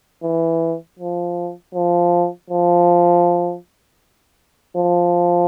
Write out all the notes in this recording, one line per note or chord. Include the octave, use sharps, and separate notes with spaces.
E3
F3
F3
F3
F3